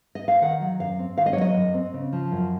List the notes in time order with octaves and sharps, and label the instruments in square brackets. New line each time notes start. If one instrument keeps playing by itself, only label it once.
[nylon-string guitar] D#5
F5
D#3 F#5
F#3
F#2 F5
C4
D#3 F5
D#5
C#5
F#3
D#5
F#2
C4
C#3
F3
F#2